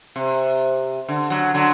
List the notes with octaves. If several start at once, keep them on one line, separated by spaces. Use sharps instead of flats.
C3
D3
D3 F#3
D3 F#3